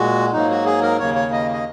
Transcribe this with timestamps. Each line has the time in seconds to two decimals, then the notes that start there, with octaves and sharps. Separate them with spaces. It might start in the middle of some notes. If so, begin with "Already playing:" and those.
Already playing: A#2 G#3 F#4
0.33 G#2 F#3 A#3 D#4
0.50 F#4
0.65 G#4
0.82 A#4
0.99 D#2 C#3 A#3 C#5
1.15 C#5
1.32 D#5
1.53 D#5